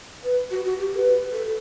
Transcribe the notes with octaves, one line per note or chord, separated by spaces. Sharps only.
B4
F#4
F#4
G4
B4
A4